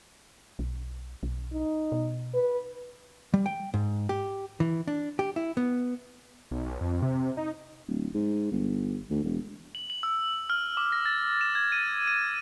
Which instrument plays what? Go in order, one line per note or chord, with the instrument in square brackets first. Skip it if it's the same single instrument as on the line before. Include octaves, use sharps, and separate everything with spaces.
[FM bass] B1
B1
[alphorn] D#4
[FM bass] B2
[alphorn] B4
[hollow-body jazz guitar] G3
G5
G#2
G4
E3
D4
G4
E4
B3
[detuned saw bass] B1
B1
F2
C3
D#4
[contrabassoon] D1
G#2
G1
D2
E1
[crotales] F#7
F#7
E6
F6
D6
A#6
A6
E7
G#6
D#7
D#7